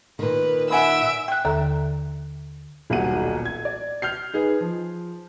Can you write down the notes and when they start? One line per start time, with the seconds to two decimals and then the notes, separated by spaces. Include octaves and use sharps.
0.19 A#2 D#3 B4
0.70 E5 F#5 G#5 B5 E6 D7
1.28 G5 F#6
1.45 D#2 D3 A4 E5 A#5
2.90 D#1 B1 G3 F#4 F#5 D#7
3.45 G#6
3.65 D5
4.02 F6 G6 C7
4.34 D#4 G#4 B4
4.61 F3